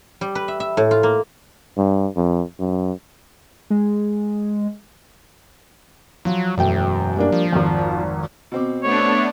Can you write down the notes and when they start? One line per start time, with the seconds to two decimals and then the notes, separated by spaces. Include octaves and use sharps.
0.21 G3
0.35 B4
0.48 E5
0.60 E5
0.77 A2
0.91 F4
1.03 A#3
1.77 G2
2.16 F2
2.59 F#2
3.70 G#3
6.25 F3 F#3
6.58 E1 F#2 A3 G5
7.17 G3 A#3 D4
7.32 F3
7.53 G#1 F2
8.52 B2 C4 D6
8.84 A3 B3 D4 C#5